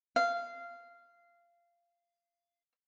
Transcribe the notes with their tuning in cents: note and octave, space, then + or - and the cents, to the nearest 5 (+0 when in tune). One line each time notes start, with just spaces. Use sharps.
F5 -15